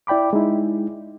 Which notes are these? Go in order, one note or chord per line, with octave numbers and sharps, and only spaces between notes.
E4 D5 G5 B5 D6
G#3 D#4 E4